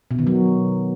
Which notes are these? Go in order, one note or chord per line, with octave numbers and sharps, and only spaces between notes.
B2
D#3
F#3